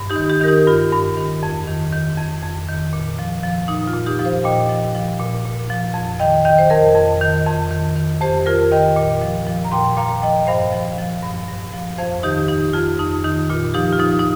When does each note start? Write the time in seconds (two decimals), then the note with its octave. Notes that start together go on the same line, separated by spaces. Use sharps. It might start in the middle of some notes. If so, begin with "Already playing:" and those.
Already playing: G2
0.10 D#4 G4
0.16 D#3
0.29 D#4 G4
0.41 D#3 A#4
0.47 D#4 G4
0.67 G2 F4
0.92 G2
1.17 D#3
1.43 F2
1.67 D#3
1.93 D#3
2.18 F2
2.42 F2
2.68 D#3
2.93 A#2
3.19 F3
3.43 F3
3.68 A#2 D#4
3.87 F4
3.94 A#2
4.06 D#4 G4
4.19 F3
4.25 C5 F5
4.44 A#2 D#5 G5
4.69 F3
4.95 F3
5.19 A#2
5.45 A#2
5.70 F3
5.94 F2
6.19 D#3 D#5 G5
6.45 D#3 D#5 G5
6.58 C5
6.70 F2 A#4 D#5
6.95 F2
7.21 D#3
7.46 F2
7.71 D#3
7.96 D#3
8.21 F2 G4 C5
8.46 F2 F4 A#4
8.72 D#3 D#5 G5
8.96 A#2
9.21 F3
9.46 F3
9.65 A#5
9.72 A#2 G5 C6
9.97 A#2 F5 A#5
10.22 F3 D#5 G5
10.47 G2 C5 F5
10.73 F3
10.98 F3
11.23 G2
11.48 G2
11.73 F3
11.98 F2 C5 F5
12.23 D#3 D#4 G4
12.48 D#3 D#4 G4
12.73 F2 F4
12.99 F2 D#4
13.24 D#3 D#4
13.49 A#2 F4
13.74 F3 D#4 G4
13.92 F4
13.99 F3 D#4
14.19 D#4